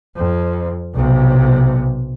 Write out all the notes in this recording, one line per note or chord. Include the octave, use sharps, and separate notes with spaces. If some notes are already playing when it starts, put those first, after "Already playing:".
F2
B1 C3